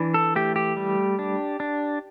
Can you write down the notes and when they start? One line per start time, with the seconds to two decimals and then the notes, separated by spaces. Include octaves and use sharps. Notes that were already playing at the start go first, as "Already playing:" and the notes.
Already playing: E3 D4
0.14 A4
0.36 A3 G4
0.56 G4
0.76 G3
1.19 D4
1.60 D4